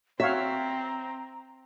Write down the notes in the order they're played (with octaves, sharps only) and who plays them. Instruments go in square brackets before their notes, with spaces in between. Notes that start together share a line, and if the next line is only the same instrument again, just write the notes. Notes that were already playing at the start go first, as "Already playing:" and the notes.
[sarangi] C4 [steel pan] F#4 C#5 F5 [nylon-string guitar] E5 [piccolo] A#5